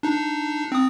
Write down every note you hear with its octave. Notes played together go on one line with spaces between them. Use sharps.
D4 D#4
C4 D#6